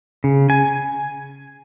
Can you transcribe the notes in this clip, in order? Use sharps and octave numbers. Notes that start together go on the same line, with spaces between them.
C#3
G#5